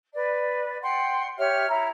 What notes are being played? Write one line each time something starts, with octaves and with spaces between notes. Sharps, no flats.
B4 D5
F#5 G5 C6
G4 C#5 E5 F6
E4 A#5